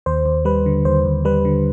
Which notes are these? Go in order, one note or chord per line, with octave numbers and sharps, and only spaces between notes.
D#2 C5
D#2
G3 B4
D3
D#2 C5
D#2
G3 B4
D3